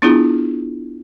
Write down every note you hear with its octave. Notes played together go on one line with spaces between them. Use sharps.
B3 D4 E4 F4 G#4